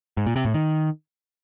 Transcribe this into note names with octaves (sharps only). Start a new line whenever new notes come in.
G#2
A#2
C3
A2
D#3